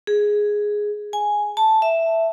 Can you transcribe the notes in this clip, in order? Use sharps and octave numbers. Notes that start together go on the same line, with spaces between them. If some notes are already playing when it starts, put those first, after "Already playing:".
G#4
G#5
A5
E5